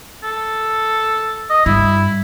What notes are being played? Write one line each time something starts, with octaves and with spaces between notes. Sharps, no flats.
A4
D#5
G2 E4